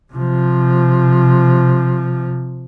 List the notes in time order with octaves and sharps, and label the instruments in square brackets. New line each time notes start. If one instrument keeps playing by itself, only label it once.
[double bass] C3 F3